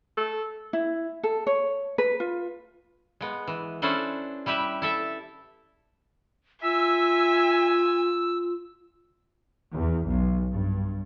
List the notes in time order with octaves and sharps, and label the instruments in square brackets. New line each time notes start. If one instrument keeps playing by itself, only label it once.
[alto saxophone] A4
[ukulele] E4
A4
C#5
B4
F4
[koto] G#3 B3
E3
C#4 D4 E4 A4 B4 C5
G3 E4 G4 B4 E5
E4 A4 E5
[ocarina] F4 [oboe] E5 [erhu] G#5 [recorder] E6
[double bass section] E2
B1
G2